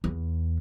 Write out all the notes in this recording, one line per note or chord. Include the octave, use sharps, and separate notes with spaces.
E2